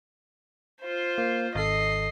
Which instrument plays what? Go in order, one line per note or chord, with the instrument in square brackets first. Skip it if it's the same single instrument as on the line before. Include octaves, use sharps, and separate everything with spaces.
[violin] F4 C5
[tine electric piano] A#3
[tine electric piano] G#1 A4 [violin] D#5 C7